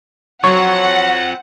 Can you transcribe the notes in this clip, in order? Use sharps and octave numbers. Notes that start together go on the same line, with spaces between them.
F#3 C4 F4 C#5 F#5